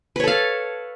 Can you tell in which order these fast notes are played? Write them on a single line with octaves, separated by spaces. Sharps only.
B4 C#5 A4 F5